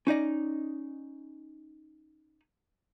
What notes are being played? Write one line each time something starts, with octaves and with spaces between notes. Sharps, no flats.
C#4 D#4 D5 D#5